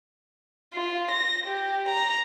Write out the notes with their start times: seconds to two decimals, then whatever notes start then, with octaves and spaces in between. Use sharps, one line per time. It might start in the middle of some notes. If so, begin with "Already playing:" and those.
0.74 F4
1.11 A#6
1.46 G4
1.89 A#5